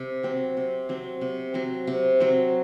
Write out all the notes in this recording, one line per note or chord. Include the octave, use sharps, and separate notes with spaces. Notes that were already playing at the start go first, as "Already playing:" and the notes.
Already playing: C3
F#3 C4
C3
F#3 C4
C3
F#3 C4
C3
F#3 C4